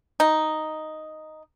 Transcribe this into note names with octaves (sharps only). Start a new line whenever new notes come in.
D#4